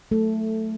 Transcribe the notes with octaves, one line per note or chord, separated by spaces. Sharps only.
F#3 A3 A4